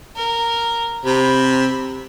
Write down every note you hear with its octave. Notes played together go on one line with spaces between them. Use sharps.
A#4
C3 B5